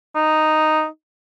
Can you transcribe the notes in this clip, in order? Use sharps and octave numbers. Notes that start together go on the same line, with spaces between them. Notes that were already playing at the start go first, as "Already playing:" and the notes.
D#4